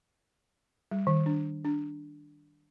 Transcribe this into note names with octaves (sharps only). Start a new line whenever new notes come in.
G3
D#3
D4
D4